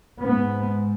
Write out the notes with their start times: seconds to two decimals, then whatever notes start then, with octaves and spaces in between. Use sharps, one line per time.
0.21 G#2 B3